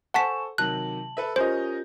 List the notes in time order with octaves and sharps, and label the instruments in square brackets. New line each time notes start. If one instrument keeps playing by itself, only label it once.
[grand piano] A4 C5 [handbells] F#5 A5 B6 [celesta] G#5 C#6 E7
[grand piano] C3 D#3 F#3 [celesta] A5 F#7 [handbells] F#6
[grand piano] A4 B4 E5
[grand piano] C#4 A#4 D#5 [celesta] F4 G4 G6 [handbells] C5